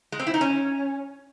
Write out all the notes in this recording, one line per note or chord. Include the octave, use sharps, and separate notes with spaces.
G#3
C4
E4
D#4
C#4